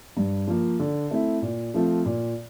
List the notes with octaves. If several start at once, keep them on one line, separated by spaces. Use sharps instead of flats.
G2
F3 A#3
D3
A3 C4 E4
A#2
F3 A3 C4 F4
A#2